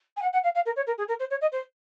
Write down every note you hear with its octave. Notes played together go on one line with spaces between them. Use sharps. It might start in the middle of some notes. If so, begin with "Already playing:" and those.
G#5
F#5
F#5
F5
F5
A#4
C#5
A#4
G#4
A#4
C5
C#5
D#5
C5